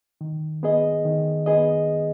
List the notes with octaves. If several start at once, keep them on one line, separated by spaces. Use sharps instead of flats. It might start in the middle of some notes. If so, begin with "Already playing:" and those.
D#3
B3 G#4 D#5
D#3
B3 G#4 D#5